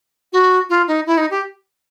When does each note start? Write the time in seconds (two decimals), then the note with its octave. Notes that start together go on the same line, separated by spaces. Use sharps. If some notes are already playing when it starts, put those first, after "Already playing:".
0.33 F#4
0.70 F4
0.88 D#4
1.07 E4
1.18 D#4
1.31 G4